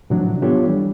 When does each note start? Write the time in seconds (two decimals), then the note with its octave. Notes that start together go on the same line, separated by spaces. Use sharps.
0.10 A2 C3 D#3 F3 F#3 D4
0.42 B3 D4 F4 G4 A4 C#5
0.66 E3 G3